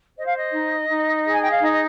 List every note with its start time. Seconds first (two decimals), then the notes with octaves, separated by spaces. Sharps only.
0.17 C5 D#5
0.26 F5
0.36 D#5
0.53 D#4
0.89 D#4
1.26 G#4
1.32 G#5
1.41 G5
1.52 F5
1.61 D#4 D#5
1.72 D#5